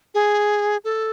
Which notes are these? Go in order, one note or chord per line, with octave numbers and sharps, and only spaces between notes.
G#4
A4